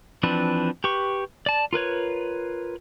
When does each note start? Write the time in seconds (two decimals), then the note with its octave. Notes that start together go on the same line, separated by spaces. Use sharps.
0.23 E3 F3 C4 D4 B4
0.84 G4 B4 C#6
1.46 D5 A5
1.73 F4 A#4 B4 C#5